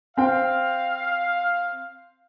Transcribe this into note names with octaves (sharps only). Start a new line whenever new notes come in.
C4 F5 G5